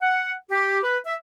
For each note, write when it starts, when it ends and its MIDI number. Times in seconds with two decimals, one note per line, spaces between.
0.02 0.33 78
0.51 0.82 67
0.83 0.99 71
1.06 1.15 76